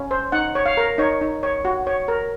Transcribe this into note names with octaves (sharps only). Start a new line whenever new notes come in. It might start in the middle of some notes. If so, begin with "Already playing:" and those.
Already playing: C#4
C5
D#4 F#5
C#5
F5
A#4
D#4 C#5
D#4
C#5
F#4
C#5
A#4